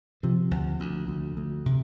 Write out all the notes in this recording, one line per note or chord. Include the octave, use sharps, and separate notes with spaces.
C3 F3
D2
D2
D2
D2
C3